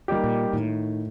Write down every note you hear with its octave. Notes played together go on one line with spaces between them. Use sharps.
G3 A#3 D#4 G4
A#2
A2 D#3